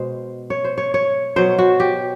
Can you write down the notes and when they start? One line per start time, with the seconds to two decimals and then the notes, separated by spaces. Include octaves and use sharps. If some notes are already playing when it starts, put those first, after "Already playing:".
Already playing: B2 G#3 C5
0.50 C#5
0.65 C5
0.78 C#5
0.94 C#5
1.36 B2 F#3 C5
1.59 F#4
1.80 G4